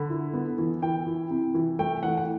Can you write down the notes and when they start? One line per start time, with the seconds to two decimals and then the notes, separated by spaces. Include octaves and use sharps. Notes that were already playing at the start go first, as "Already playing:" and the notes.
Already playing: D3 B5
0.10 E4
0.34 B3
0.58 E3
0.82 E3 G5
1.07 E4
1.30 C3
1.55 E3
1.79 A3 G5
2.03 E3 F#5
2.17 F#5